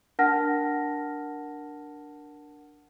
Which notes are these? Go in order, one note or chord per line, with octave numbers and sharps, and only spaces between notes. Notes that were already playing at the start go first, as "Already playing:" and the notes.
D4 A#4 F#5 A5 F6 A#6